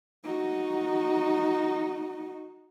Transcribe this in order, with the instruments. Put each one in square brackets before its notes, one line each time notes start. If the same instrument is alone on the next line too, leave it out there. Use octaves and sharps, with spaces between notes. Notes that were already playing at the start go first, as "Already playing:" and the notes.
[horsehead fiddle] D#4 F#4